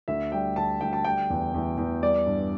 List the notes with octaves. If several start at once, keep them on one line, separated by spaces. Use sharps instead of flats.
D2 E5
G3 G5
D2 A5
D2 G5
A5
G3 G5
E2
E2
E2
G3 D5
G2